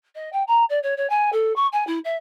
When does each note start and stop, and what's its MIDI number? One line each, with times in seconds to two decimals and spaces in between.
0.15 0.30 75
0.33 0.43 79
0.48 0.64 82
0.70 0.79 74
0.83 0.94 73
0.97 1.09 73
1.10 1.30 80
1.33 1.55 69
1.56 1.67 85
1.73 1.86 80
1.87 1.99 64
2.05 2.17 76